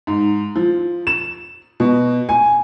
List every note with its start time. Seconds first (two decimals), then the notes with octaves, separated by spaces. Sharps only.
0.07 G#2
0.55 F3
1.07 E7
1.80 B2
2.29 G#5